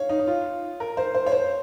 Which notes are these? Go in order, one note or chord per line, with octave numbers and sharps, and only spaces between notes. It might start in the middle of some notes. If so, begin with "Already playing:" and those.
Already playing: C#5 F5
D#4
D#4
F4
A#4
C5
C5
C#5
C5